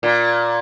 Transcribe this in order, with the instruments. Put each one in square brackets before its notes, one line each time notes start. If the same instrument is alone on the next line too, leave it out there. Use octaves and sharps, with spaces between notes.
[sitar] A#2